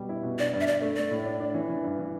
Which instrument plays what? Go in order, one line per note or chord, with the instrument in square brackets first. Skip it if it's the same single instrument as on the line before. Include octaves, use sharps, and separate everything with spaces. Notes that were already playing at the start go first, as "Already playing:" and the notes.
Already playing: [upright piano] B2 G3
E4
B2
[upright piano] D4 [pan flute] D5
[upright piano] G2
[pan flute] E5
[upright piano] G2 [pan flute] D5
[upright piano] A3
[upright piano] A3 [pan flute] D5
[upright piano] A2
D4
D4
E3
E3
G2
E3